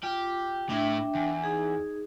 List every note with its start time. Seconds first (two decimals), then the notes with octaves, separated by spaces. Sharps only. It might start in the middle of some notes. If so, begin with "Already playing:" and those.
0.03 F4 G4
0.69 A2 D4 E4 E5 G5
1.15 E2
1.44 D#4 G#4